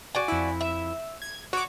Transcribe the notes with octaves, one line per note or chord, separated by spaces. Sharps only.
F#4 D5 G#5
F2 E4
E5
G#6
F#4 C#5 D6